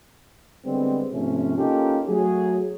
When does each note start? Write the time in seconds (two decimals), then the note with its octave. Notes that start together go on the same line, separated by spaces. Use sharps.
0.65 D3 G3 G#3 B3 C4
1.13 G#2 C3 F3 A3 C#4
1.57 A#3 C#4 D#4 F4 G4 A4
2.08 F#3 A3 G#4